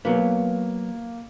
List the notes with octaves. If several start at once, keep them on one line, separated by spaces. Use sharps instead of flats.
F#3 A#3 B3